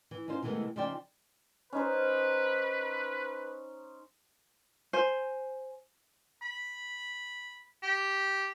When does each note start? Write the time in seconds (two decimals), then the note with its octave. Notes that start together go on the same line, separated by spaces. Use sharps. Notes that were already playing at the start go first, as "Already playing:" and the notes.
0.11 E3
0.28 C#4 D#4 F4 C5
0.43 C3 D#3 E3 G#3 A3 B3
0.76 C#3 F3 D#4 C5 D5 G5
1.73 C#4 D#4 B4 C5
4.93 C5 G#5
6.42 B5
7.83 G4